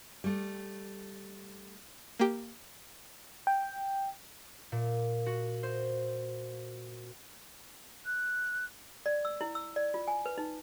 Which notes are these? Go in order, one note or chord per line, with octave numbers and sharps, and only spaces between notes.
G3 A3
A#3 G4
G5
A#2
F#4
C5
F#6
D5
E6
E4
E6
D5
F4
G#5
B4
D#4